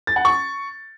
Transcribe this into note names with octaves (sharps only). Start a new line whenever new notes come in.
A6
F#5
C#6